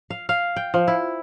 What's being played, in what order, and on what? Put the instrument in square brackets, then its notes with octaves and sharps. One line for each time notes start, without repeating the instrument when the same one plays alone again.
[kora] F5
F5
G5
F3
E4